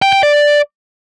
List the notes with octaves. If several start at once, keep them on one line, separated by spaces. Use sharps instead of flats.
G5
G5
D5